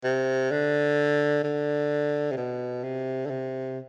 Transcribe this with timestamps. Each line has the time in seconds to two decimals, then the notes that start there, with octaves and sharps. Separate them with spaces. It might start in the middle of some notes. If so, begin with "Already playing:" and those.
0.04 C3
0.51 D3
1.44 D3
2.31 C3
2.37 B2
2.83 C3
3.26 D3
3.30 C3